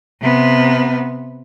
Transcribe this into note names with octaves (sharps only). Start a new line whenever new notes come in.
C3 B3